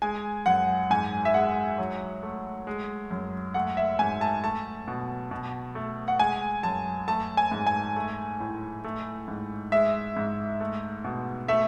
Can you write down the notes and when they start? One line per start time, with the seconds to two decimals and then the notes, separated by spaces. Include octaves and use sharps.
0.02 G#3 G#5
0.46 F#2 F#5
0.91 G#2 G#5
1.25 E5
1.34 G#3 F#5
1.78 F#3
2.23 A3
2.67 G#3
3.11 F#2
3.54 A3 F#5
3.77 E5
3.99 G#2 G#5
4.21 A5
4.43 A3 A5
4.88 B2
5.31 B2
5.75 A3
6.08 F#5
6.20 G#3 G#5
6.63 F#2 A5
7.08 A3 A5
7.37 G#5
7.52 G#2
7.67 G#5
7.96 A3
8.40 A2
8.84 A3
9.28 G#2
9.72 G#3 E5
10.17 G#2
10.61 A3
11.04 B2
11.48 A3 E5